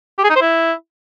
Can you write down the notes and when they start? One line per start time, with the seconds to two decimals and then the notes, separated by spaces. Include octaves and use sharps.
0.18 G4
0.24 G#4
0.30 D#4
0.36 C5
0.42 E4